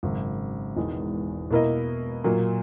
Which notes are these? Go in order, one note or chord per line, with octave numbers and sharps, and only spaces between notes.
G#1 F#2 C#3
E1 E2 D#3 G#3
B2 A#3 E4 A#4 D#5
A#2 F#3 A#3